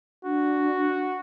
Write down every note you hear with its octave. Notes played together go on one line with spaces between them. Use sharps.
D4 F#4